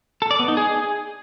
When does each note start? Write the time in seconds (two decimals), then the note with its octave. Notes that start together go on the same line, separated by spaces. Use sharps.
0.22 A4
0.31 D5
0.39 B3
0.48 D#4
0.57 G#4